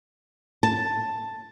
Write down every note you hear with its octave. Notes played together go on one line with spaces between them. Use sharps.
A5